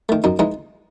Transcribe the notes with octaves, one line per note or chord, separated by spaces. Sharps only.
D#3 A3
F#2 D#4
E3 G#3 D#4